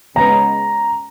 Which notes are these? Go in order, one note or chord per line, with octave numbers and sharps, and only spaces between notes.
C#3 G#3 B3 D#4 A#5